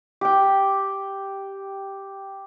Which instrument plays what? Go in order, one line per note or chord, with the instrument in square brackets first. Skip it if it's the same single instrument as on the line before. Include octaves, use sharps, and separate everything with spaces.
[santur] G4 G5